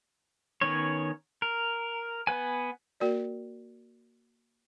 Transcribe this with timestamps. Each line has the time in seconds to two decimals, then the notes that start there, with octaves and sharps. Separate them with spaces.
0.61 D#3 B3 C#4 C#5
1.42 A#4
2.27 B3 B4 G#5
3.00 A#3 F#4 A#4 D5